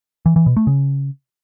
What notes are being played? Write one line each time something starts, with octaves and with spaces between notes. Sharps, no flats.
E3
E3
B2
A3
C#3